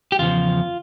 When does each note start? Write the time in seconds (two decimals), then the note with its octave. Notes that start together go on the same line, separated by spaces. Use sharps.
0.12 G4
0.19 E2 C#3 F3 F4